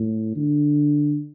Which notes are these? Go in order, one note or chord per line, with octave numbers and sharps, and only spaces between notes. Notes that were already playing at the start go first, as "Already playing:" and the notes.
Already playing: A2
D3